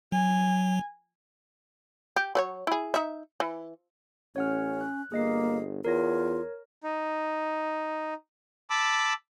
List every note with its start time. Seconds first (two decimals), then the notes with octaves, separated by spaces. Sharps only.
0.12 F#3 G#5
2.16 G4
2.35 F#3 B4 C#5
2.67 E4 G#4
2.94 D#4 E5
3.40 E3
4.36 A1 C#4 C#5 F#5 F6
4.81 F#6
5.12 G1 A#3 G#4 D#5 C7
5.85 E2 F4 A#4 C#5 A#6
6.83 D#4
8.70 A5 B5 D6 E6